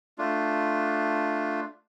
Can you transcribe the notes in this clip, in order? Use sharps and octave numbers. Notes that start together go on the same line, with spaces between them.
A3 D4 F4